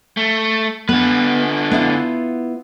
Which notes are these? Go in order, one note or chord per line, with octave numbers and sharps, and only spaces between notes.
A3
D3 B3 B4
B3 E4 F4